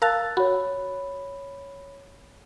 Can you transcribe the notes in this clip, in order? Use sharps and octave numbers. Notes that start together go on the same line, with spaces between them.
A#4 F5 A5 E6 F#6 A6
F#4 C#5 B5